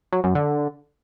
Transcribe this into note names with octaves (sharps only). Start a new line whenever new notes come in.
F#3
F#2
D3